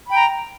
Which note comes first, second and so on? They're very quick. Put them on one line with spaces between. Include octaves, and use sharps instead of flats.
B5 G5 A#5